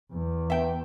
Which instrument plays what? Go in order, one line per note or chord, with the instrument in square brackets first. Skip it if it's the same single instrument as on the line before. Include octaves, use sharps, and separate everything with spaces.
[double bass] E2
[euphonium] B3 [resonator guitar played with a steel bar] E5 G5